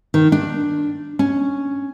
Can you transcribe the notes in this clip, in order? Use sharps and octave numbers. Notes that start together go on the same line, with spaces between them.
D#3
D4
C#4